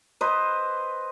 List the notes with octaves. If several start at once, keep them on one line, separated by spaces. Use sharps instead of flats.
B4 C5 D#5